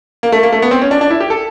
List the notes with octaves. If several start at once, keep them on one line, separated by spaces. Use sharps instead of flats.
A#3
A3
A#3
A3
B3
C4
C#4
D4
D4
E4
G4
A4